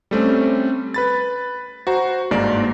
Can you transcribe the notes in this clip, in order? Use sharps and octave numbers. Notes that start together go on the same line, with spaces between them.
G3 A3 C4 C#4
B4 B5 A6
F#4 C5 A#5
G1 G#2 A#3 A#4 D5